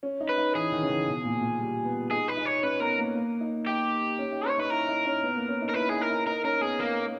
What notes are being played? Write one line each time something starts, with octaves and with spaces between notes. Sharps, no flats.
C#4
D#4
B4
D#4
E3 G#4
D#3
C#3
D#3
B2
A#2
A#2
G3
B3
D#4 G#4
B4
D#4
C#5
C#4 B4
B3 A#4
A#3
A#3
D#4
D#4 G4
C#4
D#4
C#4 C#5
D#4 B4
E4 A#4
D#4
C#4
B3
A#3
C#4
D#4
A#4
E4 B4
D#4 G#4
A#4
D#4
D#4 A#4
C#4 A#4
B3 G#4
A#3